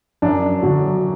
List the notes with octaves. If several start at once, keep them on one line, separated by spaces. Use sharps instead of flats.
F#2 D4
D3 F#3 F#4